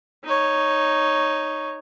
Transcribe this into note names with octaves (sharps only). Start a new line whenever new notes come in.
D#4 C#5